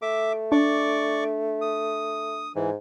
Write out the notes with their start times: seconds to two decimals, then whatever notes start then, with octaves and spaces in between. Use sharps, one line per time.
0.02 A3 E5 D6
0.52 D4 D5 C#6 D6
1.61 D#6
2.55 G#2 E3